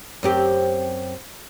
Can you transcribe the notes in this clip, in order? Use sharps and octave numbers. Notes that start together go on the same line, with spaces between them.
F#2 C4 G4